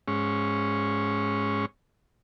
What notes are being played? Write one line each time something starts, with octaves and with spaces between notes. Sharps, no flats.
G#2 C#4